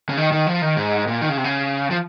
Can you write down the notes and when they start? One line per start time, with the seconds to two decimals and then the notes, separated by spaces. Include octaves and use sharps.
0.09 C#3
0.17 D#3
0.32 D#3
0.47 F3
0.62 D#3
0.76 G#2
1.07 A#2
1.22 D#3
1.29 C#3
1.37 C3
1.44 C#3
1.91 F3